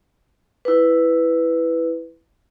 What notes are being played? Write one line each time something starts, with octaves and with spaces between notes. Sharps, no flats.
E4 B4